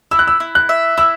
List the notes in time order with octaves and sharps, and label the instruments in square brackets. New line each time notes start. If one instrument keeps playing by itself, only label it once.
[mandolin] E4 [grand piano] E6
[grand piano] F#6
E6
[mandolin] E4
[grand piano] F#6
[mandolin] E5
[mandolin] E4 [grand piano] E6